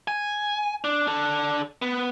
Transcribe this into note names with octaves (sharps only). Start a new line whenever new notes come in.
G#5
D4
D4 A4
B3